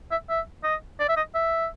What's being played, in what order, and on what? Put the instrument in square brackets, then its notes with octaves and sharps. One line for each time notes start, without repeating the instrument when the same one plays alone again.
[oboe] E5
E5
D#5
D5
E5
D#5
E5